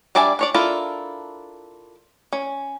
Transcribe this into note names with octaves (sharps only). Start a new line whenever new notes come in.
G3 D4 D5 E5 G#5
D4 C#5 D5
D4 E4 F4 A4 A#4
C#4